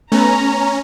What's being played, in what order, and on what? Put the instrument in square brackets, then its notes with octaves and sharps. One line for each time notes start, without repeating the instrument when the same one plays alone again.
[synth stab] A3 B3 B4 [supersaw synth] C#4 [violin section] A#5